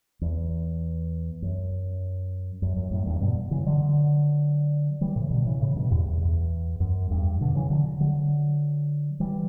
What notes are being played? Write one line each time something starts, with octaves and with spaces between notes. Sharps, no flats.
E2
F#2
F#2
F#2
F#2 A2
E2 G2
G2 B2
C#3 E3
D3 F#3
E3 G3
A2 C#3
B2 D3
C#3 E3
A2 C#3
G2 B2
E2 G2
E2
E2
F#2
E2 G2
B2 D3
C#3 E3
D3 F#3
D3 F#3
E3 G3